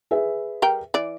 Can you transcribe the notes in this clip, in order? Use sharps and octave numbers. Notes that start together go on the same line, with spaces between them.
G#4 B4 E5
G3 A#4 G5
E3 D5